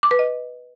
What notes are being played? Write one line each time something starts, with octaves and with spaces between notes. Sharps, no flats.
D6
B4
D#5